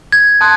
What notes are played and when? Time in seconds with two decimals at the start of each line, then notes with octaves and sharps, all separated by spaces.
0.12 G#6
0.41 A5 C6 D#6 F#6